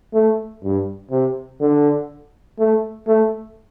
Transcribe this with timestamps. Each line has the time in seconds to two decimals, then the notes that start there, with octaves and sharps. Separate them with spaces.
0.14 A3
0.63 G2
1.11 C3
1.61 D3
2.59 A3
3.07 A3